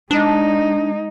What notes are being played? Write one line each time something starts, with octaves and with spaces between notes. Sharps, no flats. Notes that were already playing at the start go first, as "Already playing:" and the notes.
G#3 D4 D#4